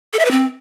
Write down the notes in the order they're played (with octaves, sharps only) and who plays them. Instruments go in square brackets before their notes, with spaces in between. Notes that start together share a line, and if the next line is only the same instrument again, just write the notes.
[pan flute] A4
E5
B4
C4